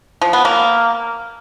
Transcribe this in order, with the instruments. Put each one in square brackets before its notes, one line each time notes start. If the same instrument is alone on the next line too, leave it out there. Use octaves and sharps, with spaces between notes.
[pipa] F3
B3
A#3